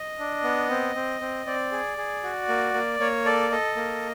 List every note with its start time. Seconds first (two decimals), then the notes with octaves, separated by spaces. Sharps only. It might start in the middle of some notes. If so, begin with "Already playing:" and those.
Already playing: D#5
0.19 D4
0.44 B3
0.70 C4
0.95 C4
1.21 C4
1.46 C4 D5
1.72 G#4
1.98 G#4
2.23 F#4
2.49 A#3
2.74 A#3
3.00 A#3 C#5
3.25 A4 D5
3.51 A4 D#5
3.76 A#3